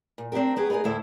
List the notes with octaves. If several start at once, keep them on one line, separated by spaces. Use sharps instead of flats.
A#2
C4 D4 D#4 G4 A#4
F#3 B3 G4 G#4
B3 D#4 G4 G#4 A#4
D2 A2 E4 A4 C5